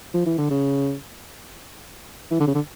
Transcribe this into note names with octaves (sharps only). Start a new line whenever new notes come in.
F3
E3
D3
C#3
E3
D3
C#3
D3